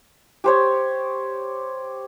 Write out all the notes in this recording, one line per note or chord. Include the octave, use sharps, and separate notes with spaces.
G4 C5 C#5